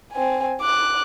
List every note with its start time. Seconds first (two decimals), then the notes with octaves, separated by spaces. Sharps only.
0.13 C4 G#5
0.62 D6 F#6